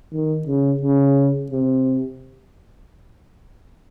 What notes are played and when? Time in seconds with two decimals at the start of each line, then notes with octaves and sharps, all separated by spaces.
0.13 D#3
0.47 C#3
0.81 C#3
1.52 C3